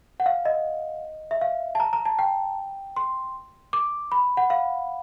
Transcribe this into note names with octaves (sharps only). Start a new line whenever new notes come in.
F#5
F5
D#5
E5
F5
A5
A#5
A#5
A5
G5
C6
D6
B5
F#5
F5